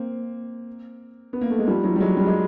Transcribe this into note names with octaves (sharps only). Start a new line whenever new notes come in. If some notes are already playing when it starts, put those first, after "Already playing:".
Already playing: A#3 C4
B3
A#3
A3
G#3
F3 G3
E3 F#3
G3
F#3 G#3
G3
G#3